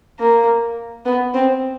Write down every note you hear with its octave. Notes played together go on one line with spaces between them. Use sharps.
A#3
B3
C4